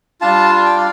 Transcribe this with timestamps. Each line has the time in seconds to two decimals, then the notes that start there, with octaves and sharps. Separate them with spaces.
0.21 G3 D4 F4 F5 A5
0.66 G5
0.77 D5 F5